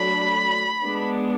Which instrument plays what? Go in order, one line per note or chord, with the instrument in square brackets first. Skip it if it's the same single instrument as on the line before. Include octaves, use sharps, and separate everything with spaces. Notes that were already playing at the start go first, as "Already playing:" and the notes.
Already playing: [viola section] F#3 A3 D4 B5
G#3 B3 D4